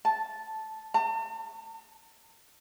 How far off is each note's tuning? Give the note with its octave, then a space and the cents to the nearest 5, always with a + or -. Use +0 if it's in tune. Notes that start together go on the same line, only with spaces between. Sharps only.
A5 -5
A5 +45